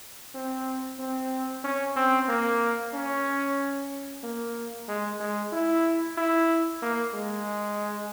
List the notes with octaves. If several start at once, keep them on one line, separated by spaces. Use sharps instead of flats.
C4
C4
C#4
C4
A#3
C#4
A#3
G#3
G#3
E4
E4
A#3
G#3